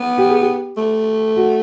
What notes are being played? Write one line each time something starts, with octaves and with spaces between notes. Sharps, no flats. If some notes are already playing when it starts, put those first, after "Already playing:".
Already playing: B3
G4
G#4
G4
A3
F#4